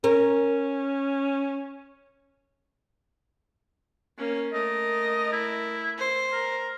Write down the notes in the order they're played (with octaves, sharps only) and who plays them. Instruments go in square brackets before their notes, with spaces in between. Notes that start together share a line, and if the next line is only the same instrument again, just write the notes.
[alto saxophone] C#4 [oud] A#4
[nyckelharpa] A#3 C#4
[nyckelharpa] A3 A#4 [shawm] D#5
[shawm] E4
[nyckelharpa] C5
[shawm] A#4